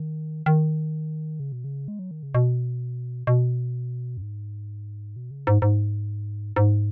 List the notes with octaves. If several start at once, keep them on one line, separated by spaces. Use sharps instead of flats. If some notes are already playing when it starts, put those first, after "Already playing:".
Already playing: D#3
D#3
C#3
B2
C#3
G#3
F#3
D#3
C#3
B2
B2
F#2
G#2
B2
C#3
G#2
G#2
G#2